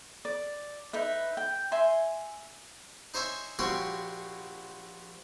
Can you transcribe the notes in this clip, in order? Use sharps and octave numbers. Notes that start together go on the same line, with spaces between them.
D5
D#4 B4 E5
G5
E5 G#5 C6
D#4 C5 C#5 E5 G#5
A#1 F#4 G4 C#5 C6